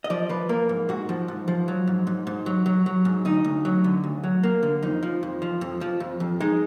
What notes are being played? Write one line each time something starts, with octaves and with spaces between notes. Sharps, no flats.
D#5
F3 D5
F3 B4
A#3 A#4
G#2
G#2 F#4
F3
G#2
F3
F#3
G#2
G#2
G#2
F#3
F#3
F#3
G#2
D2 D#4
D2
F#3
D3
D2
F#3
A#3
D3
F2 D#4
F3
F2
F3
F2
F3
F2
F2
G#3 D#4